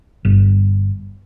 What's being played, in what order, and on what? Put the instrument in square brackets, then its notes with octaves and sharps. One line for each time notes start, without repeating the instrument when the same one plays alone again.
[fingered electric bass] G1